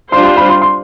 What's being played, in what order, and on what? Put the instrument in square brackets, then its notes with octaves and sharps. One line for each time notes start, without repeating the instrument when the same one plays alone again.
[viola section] G3 D4 F4 C5 [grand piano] C6
[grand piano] C6
B5
C6
C6